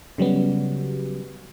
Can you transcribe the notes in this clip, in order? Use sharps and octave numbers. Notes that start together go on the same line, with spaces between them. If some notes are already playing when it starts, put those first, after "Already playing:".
C#3 F#3 G3 B3